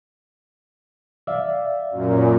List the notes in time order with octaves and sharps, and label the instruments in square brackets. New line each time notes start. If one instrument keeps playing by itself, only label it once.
[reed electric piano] D5 E5 F5
[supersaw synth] F#2 A#2